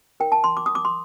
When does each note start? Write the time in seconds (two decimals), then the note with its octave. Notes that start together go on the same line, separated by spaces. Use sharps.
0.20 D#4 A#4 G5
0.32 A5
0.44 C6
0.57 D6
0.66 D#6
0.75 D6
0.85 C6